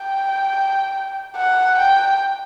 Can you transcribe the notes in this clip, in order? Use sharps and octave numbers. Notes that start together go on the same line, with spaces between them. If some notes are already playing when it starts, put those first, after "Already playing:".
Already playing: G5
F#5
G5